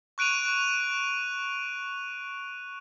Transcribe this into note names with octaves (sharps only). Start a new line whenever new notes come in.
C#6 F#6 D7 D#7 F7